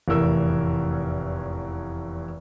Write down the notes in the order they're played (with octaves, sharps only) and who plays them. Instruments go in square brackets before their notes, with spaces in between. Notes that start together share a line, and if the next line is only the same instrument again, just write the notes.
[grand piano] F1 E2 A2 A#4 E6